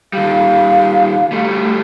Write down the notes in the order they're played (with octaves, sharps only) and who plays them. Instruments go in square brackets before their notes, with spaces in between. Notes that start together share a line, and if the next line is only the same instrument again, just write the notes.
[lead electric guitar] D#3 G3 [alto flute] F5
[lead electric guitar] G3 A3